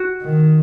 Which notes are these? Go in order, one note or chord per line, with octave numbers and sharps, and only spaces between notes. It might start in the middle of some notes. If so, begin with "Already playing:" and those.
Already playing: F#4
D#3